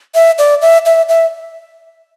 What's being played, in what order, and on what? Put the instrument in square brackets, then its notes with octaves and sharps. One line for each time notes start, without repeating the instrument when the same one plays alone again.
[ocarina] E5
D5
E5
E5
E5